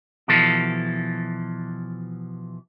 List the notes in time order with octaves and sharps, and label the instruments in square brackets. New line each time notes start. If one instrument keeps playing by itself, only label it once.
[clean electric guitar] B2 E3 F3 A4